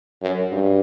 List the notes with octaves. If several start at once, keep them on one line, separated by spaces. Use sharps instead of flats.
F#2
G2